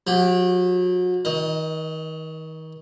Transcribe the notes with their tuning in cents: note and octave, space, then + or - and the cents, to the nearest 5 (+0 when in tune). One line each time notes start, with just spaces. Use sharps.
F#3 -35 G4 +0
D#3 +35 D#5 -5